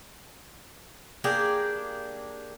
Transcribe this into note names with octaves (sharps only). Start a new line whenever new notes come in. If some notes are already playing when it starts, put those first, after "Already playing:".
A#3 D4 G4 G#4